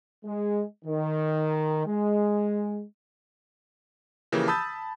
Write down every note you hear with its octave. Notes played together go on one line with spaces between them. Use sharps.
G#3
D#3
G#3
C#3 E3 F3 A#3 G4
A5 B5 D#6 E6 G6 A6